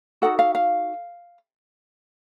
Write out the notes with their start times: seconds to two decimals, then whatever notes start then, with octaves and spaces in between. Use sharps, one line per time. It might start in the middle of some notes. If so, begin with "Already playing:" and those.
0.22 D#4 F#4 A4 F#5
0.39 F5
0.55 F5